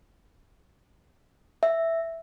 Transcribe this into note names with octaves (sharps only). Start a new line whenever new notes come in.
E5